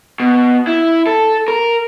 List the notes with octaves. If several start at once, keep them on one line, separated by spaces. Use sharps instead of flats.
B2
E4
A4
A#4